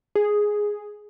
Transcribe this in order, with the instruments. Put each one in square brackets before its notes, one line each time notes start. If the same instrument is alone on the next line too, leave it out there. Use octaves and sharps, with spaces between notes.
[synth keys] G#4